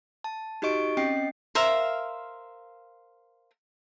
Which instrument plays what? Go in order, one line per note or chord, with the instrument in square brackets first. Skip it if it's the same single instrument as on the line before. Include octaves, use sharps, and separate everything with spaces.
[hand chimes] A5
D#4 F#4 G4 D#5 C#6 D7
C4 C#4 D#5 G5 C7
[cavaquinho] A#4 C5 E5 F5